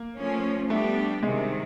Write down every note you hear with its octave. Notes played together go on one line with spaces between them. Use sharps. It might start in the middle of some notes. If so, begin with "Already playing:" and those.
Already playing: A#3
F3 A3 C#4
G3 A3 B3 D4 G4
C3 D#3 G3 G#3